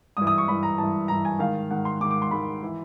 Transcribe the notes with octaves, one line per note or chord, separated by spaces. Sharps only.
G2 E3 D#6
D#6
C#6
G2 E3 B5
A#5
G2 E3 A5
G2 E3 A#5
G#5
G#2 D#3 F5
G#2 D#3 F#5
C6
G#2 D#3 D6
D6
C6
G#2 D#3 B5
E3